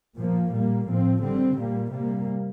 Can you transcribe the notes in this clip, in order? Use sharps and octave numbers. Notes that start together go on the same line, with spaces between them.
A#2 F3 A#3
A#2 G3 A#3
A2 F3 C4
D3 G3 C4
A#2 G3 A#3
C3 G3 A#3